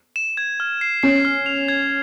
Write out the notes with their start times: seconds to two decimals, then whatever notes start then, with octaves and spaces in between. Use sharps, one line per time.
0.16 E7
0.37 G#6
0.60 F6
0.81 C7
1.03 C#4 C7
1.25 F6
1.46 F7
1.68 G#6